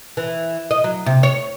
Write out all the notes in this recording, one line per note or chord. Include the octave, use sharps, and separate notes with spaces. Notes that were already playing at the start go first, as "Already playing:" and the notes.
E3
D#5
F#3
C3
C#5